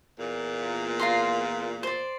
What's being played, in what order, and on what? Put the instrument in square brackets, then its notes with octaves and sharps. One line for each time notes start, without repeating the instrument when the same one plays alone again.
[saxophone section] E2 A#2
[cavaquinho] F4 A#5 C6
C5 D5